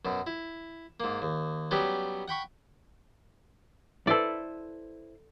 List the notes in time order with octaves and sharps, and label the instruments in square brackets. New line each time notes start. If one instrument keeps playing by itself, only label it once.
[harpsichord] F#2 B2
E4
G#2 A#3
D#2
F#3 G3 B3 C#4 G4
F#5 G5 B5 C#6
[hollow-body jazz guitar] E4 B4 C5 [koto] A4 D5